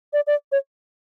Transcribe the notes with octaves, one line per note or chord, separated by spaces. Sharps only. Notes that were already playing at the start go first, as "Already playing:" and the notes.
D5
D5
C#5